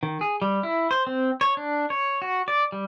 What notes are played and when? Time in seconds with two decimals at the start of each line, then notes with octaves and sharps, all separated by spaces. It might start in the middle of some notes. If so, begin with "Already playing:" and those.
0.03 D#3
0.21 G#4
0.42 G3
0.63 E4
0.91 C5
1.07 C4
1.41 C#5
1.57 D4
1.90 C#5
2.22 F#4
2.48 D5
2.72 G3